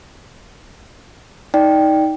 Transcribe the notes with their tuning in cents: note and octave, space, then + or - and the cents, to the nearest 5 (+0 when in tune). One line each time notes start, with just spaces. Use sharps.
D#4 +15 D5 +0 G5 +0